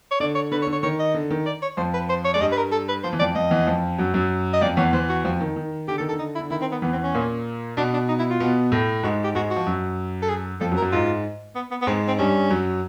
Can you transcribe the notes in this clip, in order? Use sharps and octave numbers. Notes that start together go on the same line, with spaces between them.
C#5
D3 D5
C#5
D3 B4
C#5
D3
C#5
D#3 C#5
D#5
D3
D#3
D5
C#5
F2 F3 C5
B4
C5
C#5
G#3 D5
G2 G3 D#5
B4
A#4
A4
B4
F3 C5
E3
F2 F3 D5
F2 F3 D#5
E2 E3
F2 F3
F#2 F#3
F#2 F#3
D#5
F2 F3 D5
E2 E3 C#5
E2 E3 C5
F#4
F2 F3
D#3
D#3
D3 G4
D#3 A4
A4
D3
D#4
E4
D3
D#3 E4
C4
B3
E2 E3 B3
C4
C#4
A#2 A#3
B2 B3 D4
D4
D#4
E4
F4
B2 B3
A2 A3
G#2 G#3 F#4
G4
G#2 G#3 F#4
F#4
F3
F#2 F#3
A4
G#4
F2 F3 A4
F#2 F#3
A#4
F#2 F#3
G#2 G#3 F4
B3
B3
B3
G#2 G#3 C4
C4
G2 G3 C#4
F#2 F#3